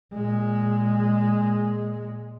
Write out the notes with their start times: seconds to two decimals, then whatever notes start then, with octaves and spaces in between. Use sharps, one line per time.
0.14 A#2 G#3